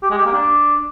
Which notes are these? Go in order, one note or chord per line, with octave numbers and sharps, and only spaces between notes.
G4
G#3
G4
A#3
D4